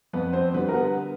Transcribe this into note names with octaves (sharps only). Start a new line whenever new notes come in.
F2 B3 B4
C4 C5
D3 G3 B3 B4
A#4
B3 B4